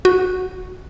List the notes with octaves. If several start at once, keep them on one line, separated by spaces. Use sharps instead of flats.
F#4